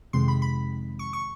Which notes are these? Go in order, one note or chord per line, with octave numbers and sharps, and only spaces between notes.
F2 C3 D#3 G#3 C6
B5
B5
C#6
C#6